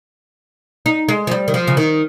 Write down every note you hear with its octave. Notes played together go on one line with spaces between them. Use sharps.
D#4
G#3
F3
G3
D#3
F3
C#3
D#3